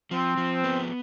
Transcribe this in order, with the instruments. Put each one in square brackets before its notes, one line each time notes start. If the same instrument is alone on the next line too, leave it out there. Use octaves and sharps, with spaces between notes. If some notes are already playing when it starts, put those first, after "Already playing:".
[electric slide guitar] F3 [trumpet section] C4
[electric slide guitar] F3
B3